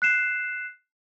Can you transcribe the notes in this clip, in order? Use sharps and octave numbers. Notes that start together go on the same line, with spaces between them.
F#6 C7 E7